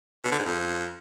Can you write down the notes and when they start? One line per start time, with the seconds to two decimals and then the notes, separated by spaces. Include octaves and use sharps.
0.25 B2
0.31 D3
0.38 G#2
0.45 F2